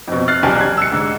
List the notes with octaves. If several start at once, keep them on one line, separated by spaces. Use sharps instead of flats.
F2 B2
F6 F#6 A6 C7
E1 B1 G4 G#5 A5
F#6 G#6
E6 C#7
G#2 D3